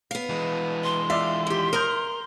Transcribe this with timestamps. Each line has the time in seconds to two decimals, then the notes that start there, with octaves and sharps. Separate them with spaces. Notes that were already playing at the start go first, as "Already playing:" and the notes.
0.11 B3 F5
0.29 E3 G#3
0.84 C6
1.10 F4 D5 E5 F5
1.47 D#3 G4
1.73 A#4 A#5 D#6 F6 G6